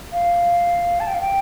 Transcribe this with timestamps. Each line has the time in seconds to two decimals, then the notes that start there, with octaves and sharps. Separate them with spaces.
0.13 F5
1.00 A5
1.07 G5
1.14 F5
1.21 G5